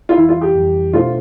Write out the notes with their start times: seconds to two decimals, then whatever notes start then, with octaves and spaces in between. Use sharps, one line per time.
0.09 F4
0.16 F2 E3 G3 E4
0.29 F4
0.41 G4
0.55 F2 E3 G3
0.93 B2 A3 D4 F4 A4 C5